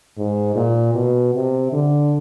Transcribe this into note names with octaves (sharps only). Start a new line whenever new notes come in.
G#2
A#2
B2
C3
D3